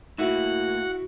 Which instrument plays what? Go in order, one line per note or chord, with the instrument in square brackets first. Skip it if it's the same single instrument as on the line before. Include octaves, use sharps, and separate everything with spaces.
[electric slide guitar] A2 A#3 [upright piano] E4 [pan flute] F#4 [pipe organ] F#5